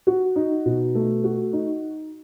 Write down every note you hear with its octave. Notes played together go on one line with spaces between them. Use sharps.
F#4
D#4
B2
A3
F#4
D#4